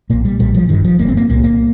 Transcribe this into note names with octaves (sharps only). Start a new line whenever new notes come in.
A#1 A#2 A#3
G3
A#1 A#2 G3
F3
G1 G2 D#3
F3
G1 G2 A#3
C4
A#3
C2 A#2 A#3
A#3